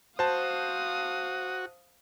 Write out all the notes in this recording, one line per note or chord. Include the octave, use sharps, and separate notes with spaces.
F#4 C5 F5 A5 D#6